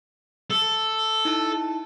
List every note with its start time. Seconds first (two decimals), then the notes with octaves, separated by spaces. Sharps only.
0.50 A4
1.25 D#4 E4 A5